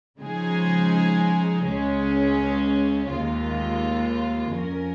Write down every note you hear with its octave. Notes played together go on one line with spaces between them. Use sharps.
C#3 F3 G#3 D#4 G#4
C#2 C#3 G#3 C#4
D#2 D#3 G#3 F4
F2 F3 C#4 A#4